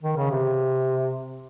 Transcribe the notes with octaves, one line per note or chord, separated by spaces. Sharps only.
D#3
C#3
C3